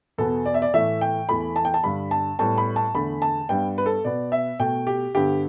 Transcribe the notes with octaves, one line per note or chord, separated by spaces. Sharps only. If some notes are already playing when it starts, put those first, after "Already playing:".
E2 B2 B3 A4
D5
E5
D5
A2 E3 A3 E5
G5
E2 E3 A3 B5
A5
G5
A5
G2 D3 G3 B5
A5
A2 G3 B3 A5
B5
A5
E2 D3 A3 B5
A5
G2 G3 B3 G5
B4
A4
B2 B3 D5
E5
B2 A3 G5
G4
G2 D3 B3 G4